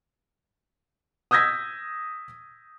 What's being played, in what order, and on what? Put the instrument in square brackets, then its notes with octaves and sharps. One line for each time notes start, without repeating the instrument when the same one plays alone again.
[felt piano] D#6 E6 G6 G#6 A#6 B6